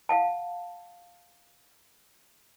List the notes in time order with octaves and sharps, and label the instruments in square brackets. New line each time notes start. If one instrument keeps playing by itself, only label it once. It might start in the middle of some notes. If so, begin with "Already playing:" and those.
[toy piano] F5 F#5 A5